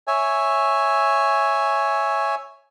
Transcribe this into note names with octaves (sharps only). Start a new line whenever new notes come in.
C#5 E5 G#5